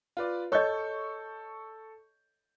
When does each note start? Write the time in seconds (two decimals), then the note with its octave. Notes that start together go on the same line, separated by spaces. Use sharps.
0.17 F4 B4 D5
0.52 A4 C#5 D#5 C#6 G6